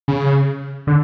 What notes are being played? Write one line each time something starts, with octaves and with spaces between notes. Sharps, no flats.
C#3
D3